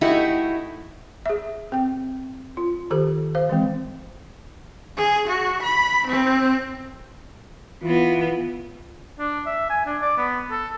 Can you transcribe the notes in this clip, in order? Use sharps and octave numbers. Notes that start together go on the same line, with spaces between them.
A3 D#4 E4 F#4 G4
G#4 E5
C4 G5
F4
D#3 G4 A4 C5
C5 F5
E3 G#3 C4
G#4
F#4
B5
C4
E3 B3 F4
D4
E5
G#5
D4
D5
B3
A4